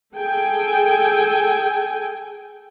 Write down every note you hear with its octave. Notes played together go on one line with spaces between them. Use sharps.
G#4 A4 G5 G#5